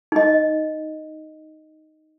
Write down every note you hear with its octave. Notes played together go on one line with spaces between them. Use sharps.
D#4 D#5